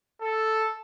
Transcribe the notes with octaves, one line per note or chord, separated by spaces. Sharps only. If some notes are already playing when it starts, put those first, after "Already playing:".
A4